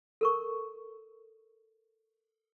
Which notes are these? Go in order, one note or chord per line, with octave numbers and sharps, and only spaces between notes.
A4 A#4 C#6